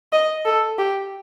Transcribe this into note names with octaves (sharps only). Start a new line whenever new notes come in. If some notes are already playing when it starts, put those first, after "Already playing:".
D#5
A4
G4